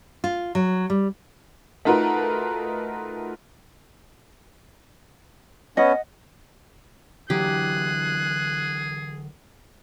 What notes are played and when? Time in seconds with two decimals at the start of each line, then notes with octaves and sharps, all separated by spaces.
0.24 F4
0.55 F#3
0.90 G3
1.85 A3 D#4 F4 F#4 A#4 B4
5.77 B3 C#4 D#5 F#5
7.30 D3 E3 F#3 G4 G#4 F#6